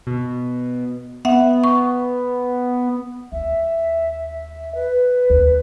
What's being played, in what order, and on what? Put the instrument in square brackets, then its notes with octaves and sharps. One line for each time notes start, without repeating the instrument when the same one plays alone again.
[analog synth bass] B2
[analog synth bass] B3 [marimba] E5 F#5
[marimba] C#6
[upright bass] D#2 [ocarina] E5
[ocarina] B4
[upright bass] D#2